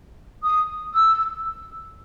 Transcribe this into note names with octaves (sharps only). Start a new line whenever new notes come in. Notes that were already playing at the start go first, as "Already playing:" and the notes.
D#6
E6